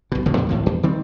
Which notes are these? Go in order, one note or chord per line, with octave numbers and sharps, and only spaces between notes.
B1 B2
D1 A1 D3 F3
E2 C3
D2 A2 F3
E2
D#3 G3 C4